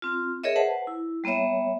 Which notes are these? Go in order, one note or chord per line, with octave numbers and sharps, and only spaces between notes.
C4 F4
G#4 A#4 C#5 D#5 E5
B4 C5 F#5 A5
E4
G3 A#3 B3 C#5 E5